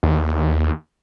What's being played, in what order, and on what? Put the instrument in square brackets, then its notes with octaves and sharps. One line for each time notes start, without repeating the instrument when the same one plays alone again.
[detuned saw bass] D#2